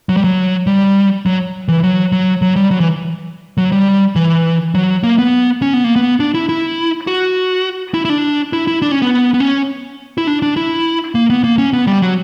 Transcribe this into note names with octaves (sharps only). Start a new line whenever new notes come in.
F#3
G3
F#3
G3
F#3
E3
F#3
F#3
F#3
G3
F#3
E3
F#3
G3
E3
F#3
A#3
B3
C#4
B3
A#3
B3
D4
E4
E4
F#4
E4
E4
D4
E4
E4
D4
C#4
B3
B3
C#4
E4
D4
D4
E4
A#3
B3
A#3
C#4
B3
G3
F#3